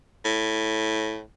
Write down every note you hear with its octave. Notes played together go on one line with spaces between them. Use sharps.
A2